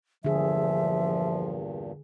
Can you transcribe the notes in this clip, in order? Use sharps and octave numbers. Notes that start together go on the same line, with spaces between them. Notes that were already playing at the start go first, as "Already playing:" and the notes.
E2 G2 A#2 D3 F3 G#4 E5